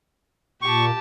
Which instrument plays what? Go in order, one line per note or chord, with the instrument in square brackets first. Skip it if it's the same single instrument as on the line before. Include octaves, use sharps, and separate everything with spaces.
[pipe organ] A#2 [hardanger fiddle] G4 A5 [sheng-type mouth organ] C#6